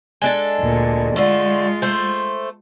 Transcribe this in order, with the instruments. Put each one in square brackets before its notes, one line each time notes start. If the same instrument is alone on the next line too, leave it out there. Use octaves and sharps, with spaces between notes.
[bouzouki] G#3 D4 A4
[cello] D2 A#2
[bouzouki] D3 A3 [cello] G#3 F4
[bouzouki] A3 C5